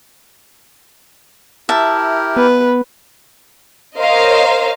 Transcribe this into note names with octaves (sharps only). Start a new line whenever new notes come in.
E4 G4 A#4 E5 A5
B3 B4
A#4 C5 C#5 D#5 F5 A#5